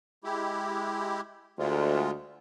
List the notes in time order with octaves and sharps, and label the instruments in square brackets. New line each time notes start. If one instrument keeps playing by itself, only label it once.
[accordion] G#3 E4 G4
[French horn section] D2 [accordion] G#3 F4